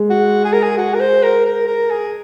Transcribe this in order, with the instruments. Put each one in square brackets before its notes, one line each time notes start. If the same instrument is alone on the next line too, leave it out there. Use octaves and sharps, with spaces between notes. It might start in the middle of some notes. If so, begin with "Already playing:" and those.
Already playing: [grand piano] G#3
[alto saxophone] F#4
G#4
A#4
G#4
F#4
A#4
C5
A#4
A#4
A#4
G#4